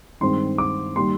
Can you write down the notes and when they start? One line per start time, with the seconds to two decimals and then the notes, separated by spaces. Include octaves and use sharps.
0.21 G2 D#3 G#3 C4 C6
0.58 D6
0.96 D#3 G3 A#3 C6